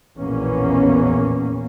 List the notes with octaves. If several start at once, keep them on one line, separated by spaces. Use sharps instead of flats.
A#1 E2 B2 A#3 B3 C#4